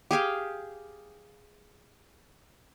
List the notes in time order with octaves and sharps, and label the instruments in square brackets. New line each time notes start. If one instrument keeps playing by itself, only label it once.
[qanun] G4 G#4 F5 G5